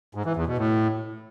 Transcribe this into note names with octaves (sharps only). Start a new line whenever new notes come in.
G#2
E3
E2
B2
A2